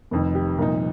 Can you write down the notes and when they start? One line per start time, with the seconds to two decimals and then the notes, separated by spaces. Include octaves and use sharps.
0.11 F1 F2 D#3
0.35 G4
0.58 C2 A#2 F3 D#4 A#4